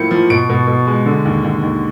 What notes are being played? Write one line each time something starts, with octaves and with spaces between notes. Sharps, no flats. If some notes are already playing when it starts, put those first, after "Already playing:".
Already playing: A2 F3 A#3 C#7
F3
B2 D7
B2
B2
G#3
D3
D#2
D#2
D#2